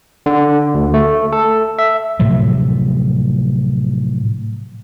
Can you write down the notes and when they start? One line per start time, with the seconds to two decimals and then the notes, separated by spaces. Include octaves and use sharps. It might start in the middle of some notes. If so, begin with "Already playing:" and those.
0.26 D3
0.74 D2
0.94 A3
1.33 A4
1.79 E5
2.20 A2 C3 F3 F#3